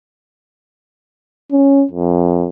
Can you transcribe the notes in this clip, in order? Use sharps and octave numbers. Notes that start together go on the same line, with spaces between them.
C#4
F2